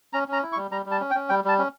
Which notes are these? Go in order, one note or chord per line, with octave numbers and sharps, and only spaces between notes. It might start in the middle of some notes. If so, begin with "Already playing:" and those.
C#4 A#5
C#4 A#5
E4
C#6
G3
G3 A#5
G3
A5
C#4
G5
C#4
G3 G5
G3 A5
C#4